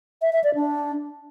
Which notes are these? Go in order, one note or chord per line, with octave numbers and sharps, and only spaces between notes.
E5
E5
D5
D4